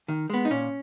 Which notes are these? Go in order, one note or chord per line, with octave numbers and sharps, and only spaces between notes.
D#3
G#3 B3
D#4
A#2 C#4